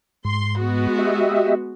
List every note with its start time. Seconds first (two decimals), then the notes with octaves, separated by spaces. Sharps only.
0.25 G#2 C6
0.58 G#3 B3 F#4
0.98 G4 D#5 E5